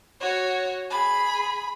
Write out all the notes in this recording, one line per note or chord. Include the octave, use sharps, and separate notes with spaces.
F#4 C#5
G#4 B5